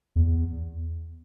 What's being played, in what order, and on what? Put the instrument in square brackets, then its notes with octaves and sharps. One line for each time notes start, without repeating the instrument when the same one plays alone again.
[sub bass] E2